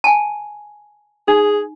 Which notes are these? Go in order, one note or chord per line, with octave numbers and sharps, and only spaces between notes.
G#5 A5
D#4 G#4